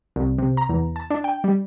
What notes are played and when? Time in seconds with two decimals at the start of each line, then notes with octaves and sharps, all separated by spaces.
0.16 C2
0.38 C3
0.57 A#5
0.69 E2
0.96 A5
1.10 D4
1.24 G5
1.44 G3